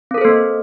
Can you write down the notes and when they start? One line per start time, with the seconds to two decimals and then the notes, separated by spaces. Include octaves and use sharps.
0.11 C4
0.14 A#4
0.18 A4
0.21 C5
0.25 A#3